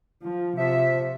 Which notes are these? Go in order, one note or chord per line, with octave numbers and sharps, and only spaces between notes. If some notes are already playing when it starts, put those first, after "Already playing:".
F3
C3 F3 E5